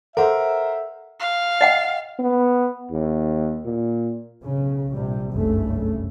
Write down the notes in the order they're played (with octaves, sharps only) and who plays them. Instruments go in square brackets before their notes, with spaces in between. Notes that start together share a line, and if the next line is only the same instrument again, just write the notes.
[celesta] A4 F#5 [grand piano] A#4 C5 [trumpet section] E5
[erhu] F5
[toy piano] D#5 F#5 G5
[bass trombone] B3
D#2
A#2
[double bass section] B1 C#3
A#1 C3 G3
F#1 C2 G2 C#3 A3